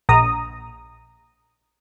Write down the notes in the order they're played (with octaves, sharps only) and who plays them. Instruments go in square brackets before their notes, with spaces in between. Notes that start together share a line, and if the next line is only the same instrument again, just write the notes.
[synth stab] A#1 A#5 D#6